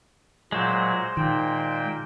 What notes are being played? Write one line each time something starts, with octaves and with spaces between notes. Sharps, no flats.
A#2 F#3 G#3 C5
A#2 D#3 G5